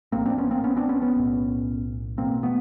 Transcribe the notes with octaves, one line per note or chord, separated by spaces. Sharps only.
A#1 A2 A#3 C4
C4 D4
B3 C#4
A#3 C4
B3 C#4
C4 D4
B3 C#4
B3 C#4
B1 A2
E1 E2 B2 A#3 C4
A3 B3